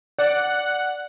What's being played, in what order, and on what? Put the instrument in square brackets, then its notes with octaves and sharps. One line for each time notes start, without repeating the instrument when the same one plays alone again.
[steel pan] D5 [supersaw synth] F#5